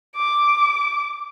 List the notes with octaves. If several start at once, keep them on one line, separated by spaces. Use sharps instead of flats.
D6